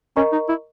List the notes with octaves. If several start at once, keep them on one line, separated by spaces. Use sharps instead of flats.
C#4 A#4 D#5 A#5 C#6
D#4
E4